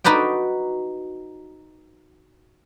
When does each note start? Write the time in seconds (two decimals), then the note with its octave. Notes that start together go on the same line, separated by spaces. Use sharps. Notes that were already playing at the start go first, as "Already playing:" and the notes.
0.04 D#4 F#4 B4 D5 G5